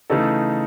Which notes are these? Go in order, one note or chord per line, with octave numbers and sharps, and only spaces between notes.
C#3 E3 A3 D#4 A4